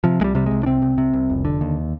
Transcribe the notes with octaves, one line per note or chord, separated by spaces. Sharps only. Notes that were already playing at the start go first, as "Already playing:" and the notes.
C3 F3
C2 G3 G#3
C3 G3
C2 G#3
D4
C3 C4
C2
C3
C2
F1
D3
D#2